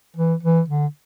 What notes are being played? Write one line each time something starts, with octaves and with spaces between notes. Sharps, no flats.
E3
E3
D3